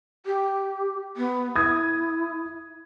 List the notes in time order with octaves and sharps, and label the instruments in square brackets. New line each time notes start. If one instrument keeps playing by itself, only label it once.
[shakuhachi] G4
B3
[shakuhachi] E4 [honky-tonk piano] D#6 G#6